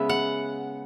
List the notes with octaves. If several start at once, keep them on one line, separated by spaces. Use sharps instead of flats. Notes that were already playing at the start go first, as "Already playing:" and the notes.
Already playing: C#3 G#3 B3 E5
F#5